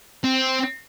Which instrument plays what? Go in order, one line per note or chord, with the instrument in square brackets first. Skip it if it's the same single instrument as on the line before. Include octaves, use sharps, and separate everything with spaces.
[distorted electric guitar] C4